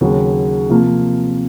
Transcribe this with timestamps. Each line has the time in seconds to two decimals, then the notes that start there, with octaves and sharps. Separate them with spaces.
0.01 D#2 C#3 F#3
0.69 C3 F3 A#3